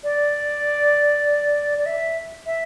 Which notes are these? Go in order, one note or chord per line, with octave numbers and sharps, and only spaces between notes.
D5
D5
E5
E5